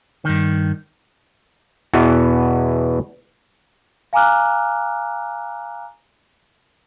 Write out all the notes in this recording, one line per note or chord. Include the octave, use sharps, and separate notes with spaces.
G2 D#3
E2 B2 E3 B3
F5 G#5 A#5 D6 F6 F#6